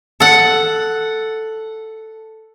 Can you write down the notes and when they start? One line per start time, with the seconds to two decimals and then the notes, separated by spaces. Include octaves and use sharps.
0.20 A4 F#5